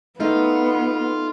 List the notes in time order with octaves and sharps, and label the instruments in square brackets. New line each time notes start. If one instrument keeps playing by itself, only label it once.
[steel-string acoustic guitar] A3 D#4 [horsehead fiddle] B3 [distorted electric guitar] F4